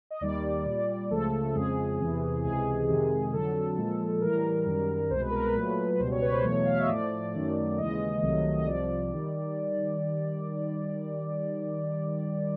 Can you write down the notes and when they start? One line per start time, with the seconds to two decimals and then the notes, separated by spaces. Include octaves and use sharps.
0.11 D#5
0.21 D#2 D#3 G3 D5
0.66 A#2 G3
1.11 C#2 C#3 F3 A3 A4
1.50 A4
1.55 F2 C#3 F3 G#3 G#4
1.99 E2 C3 E3
2.44 C#2 C3 E3 G#3 G#4
2.88 F2 C3 D#3 G#3
3.33 F2 D3 F#3 A4
3.77 A#2 F3 G#3
4.21 A2 E3 G3 A#4
4.66 F#2 D#3 G3
5.10 C2 B2 G#3 C5
5.21 B4
5.31 A#4
5.41 B4
5.55 A#2 F#3 A3
5.94 B4
6.00 C#2 B2 G3 C5
6.11 C#5
6.22 B4
6.32 C5
6.44 E2 B2 F#3 A3 C#5
6.65 F5
6.74 E5
6.81 D#5
6.88 A2 F3 A3 D5
7.33 F#2 D#3 F#3 A3
7.78 D#2 C#3 E3 G#3 D#5
8.22 C2 C3 D#3 F#3 A3
8.58 D#5
8.66 C2 C3 F3 D5
9.11 D#3 G3